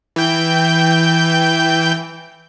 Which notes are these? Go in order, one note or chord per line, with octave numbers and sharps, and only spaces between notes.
E3 G5 G6